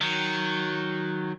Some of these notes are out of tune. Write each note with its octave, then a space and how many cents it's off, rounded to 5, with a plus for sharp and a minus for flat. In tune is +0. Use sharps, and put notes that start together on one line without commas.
D#3 +0 F#3 +0